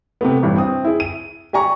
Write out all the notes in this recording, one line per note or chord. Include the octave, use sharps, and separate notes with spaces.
C3 A3 B3
A1 G2
C4 D#6
E4 G#4
D#7
G4 D5 G#5 A#5 C#6